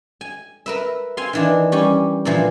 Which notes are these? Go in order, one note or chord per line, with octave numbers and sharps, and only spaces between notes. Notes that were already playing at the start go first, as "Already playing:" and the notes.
G#5
A#4 B4 E5
C4 F5 G#5 C6
D#3 E3 D4
G3 C#4 G4
A#2 D3 E3 F3